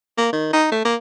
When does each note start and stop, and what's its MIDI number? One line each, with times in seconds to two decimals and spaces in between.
0.18 0.32 58
0.33 0.53 51
0.53 0.67 63
0.72 0.84 57
0.85 0.96 58